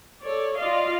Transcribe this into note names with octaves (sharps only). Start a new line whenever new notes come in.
A4 C#5 D5
F4 D5 D#5 F5